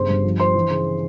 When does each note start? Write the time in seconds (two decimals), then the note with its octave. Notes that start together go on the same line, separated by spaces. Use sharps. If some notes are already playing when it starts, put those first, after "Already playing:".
Already playing: G1 C#3 C5 C6
0.09 G2
0.24 F3
0.39 F3 C5 C6
0.55 E3
0.70 C#3